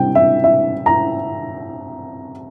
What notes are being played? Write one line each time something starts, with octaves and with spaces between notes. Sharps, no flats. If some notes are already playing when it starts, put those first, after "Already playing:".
Already playing: C3 G3 C4 G5
E5
E5
A#5